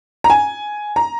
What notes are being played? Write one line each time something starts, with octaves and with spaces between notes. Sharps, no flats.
A#5
G#5
A#5